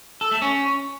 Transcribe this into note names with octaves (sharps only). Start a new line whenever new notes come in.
A4
A3
C#4